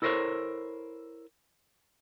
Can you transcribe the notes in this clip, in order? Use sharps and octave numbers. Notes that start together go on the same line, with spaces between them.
E4 A4 A#4 C5 C#5